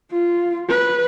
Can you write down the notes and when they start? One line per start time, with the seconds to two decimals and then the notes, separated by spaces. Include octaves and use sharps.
0.12 F4
0.69 B4